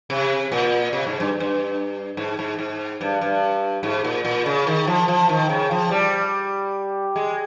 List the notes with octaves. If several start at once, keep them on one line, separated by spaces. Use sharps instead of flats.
C3
A#2
C3
G#2
G2
G2
G#2
G#2
G#2
G2
G2
G#2
A#2
A#2
C#3
D#3
F3
F3
D#3
C#3
F3
G3
G#3